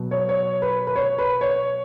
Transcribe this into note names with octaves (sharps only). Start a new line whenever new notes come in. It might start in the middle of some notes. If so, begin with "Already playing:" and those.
Already playing: B2 F#3
C#5
C#5
B4
B4
C#5
B4
C#5